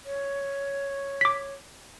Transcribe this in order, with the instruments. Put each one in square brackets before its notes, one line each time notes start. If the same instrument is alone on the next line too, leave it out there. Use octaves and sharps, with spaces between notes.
[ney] C#5
[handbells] D6 B6